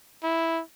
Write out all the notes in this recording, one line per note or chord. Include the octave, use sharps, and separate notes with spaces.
E4